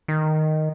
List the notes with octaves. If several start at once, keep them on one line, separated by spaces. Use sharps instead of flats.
D#3